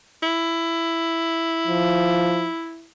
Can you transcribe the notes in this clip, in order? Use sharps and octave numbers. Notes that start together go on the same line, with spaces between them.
E4
F3